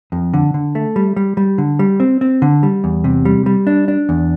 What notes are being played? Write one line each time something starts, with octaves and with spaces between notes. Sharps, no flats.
F2
D3
D3
A3
G3
G3
G3
D3
G3
C4
C4
D3
G3
E2
C3
G3
G3
D4
D4
E2